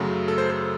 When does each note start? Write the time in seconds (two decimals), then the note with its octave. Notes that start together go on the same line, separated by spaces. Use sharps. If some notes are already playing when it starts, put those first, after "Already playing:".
Already playing: F#2 C#3 F#3 A3
0.28 A4
0.38 C5
0.49 A4